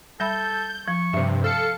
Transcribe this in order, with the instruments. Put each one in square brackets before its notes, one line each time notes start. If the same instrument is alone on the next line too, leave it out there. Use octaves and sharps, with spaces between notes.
[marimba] G3 E5 B5 [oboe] A4 [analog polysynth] G6
[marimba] F3 [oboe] C#6
[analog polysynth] G2 C3 [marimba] C5 E5
[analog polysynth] A4 C#7 [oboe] F5